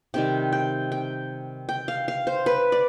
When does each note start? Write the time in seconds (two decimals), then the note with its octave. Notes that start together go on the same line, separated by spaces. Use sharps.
0.14 C3 D#3 G3 G5
0.53 G5
0.92 G5
1.69 G5
1.88 F5
2.08 F5
2.27 C5
2.46 B4
2.72 D5